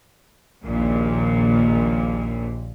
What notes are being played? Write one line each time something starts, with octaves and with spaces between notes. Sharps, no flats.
A#1 D#2 A#2